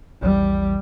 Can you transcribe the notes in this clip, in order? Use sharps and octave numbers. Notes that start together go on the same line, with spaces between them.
A#1 E2 G3